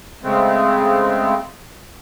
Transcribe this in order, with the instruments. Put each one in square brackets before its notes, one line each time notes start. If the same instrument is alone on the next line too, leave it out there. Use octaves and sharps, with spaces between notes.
[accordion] C#3 G#3 A3 C4